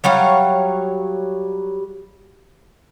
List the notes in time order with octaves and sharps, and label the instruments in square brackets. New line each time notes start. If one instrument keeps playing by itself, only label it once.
[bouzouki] F#3 G3 C#5 F5